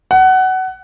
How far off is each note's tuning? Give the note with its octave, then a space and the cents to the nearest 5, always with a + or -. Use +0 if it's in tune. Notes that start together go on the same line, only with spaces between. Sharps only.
F#5 +20